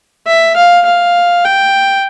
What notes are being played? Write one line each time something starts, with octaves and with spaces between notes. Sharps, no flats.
E5
F5
F5
G5